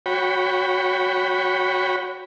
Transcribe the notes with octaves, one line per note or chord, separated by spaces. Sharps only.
F#4 C#5 G5 B5